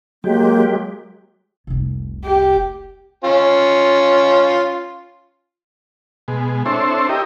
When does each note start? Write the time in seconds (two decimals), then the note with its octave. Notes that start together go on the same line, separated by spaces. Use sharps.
0.24 F#3 G#3 A#3 G4
1.67 F1 C2
2.25 G4
3.24 C#4 F4
6.28 B2 G#3
6.66 C4 D4 E4 A4 C5 C#5
7.09 E4 G4 A#4 D#5